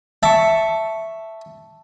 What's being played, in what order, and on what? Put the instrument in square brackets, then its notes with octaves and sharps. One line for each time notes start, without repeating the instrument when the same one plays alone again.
[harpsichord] E5 [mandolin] A5 C#6